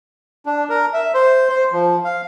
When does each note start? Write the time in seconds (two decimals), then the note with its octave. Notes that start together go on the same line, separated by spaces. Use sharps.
0.46 D4
0.69 A#4
0.93 E5
1.14 C5
1.49 C5
1.72 F3
2.04 F5